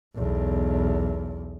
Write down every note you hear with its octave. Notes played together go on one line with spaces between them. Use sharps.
B1 E2